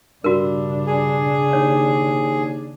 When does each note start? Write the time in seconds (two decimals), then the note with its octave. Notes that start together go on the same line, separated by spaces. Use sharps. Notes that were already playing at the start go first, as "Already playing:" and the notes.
0.24 G2 C#3 D4 F#4 A#4
0.87 G#4
1.53 D#2 C#5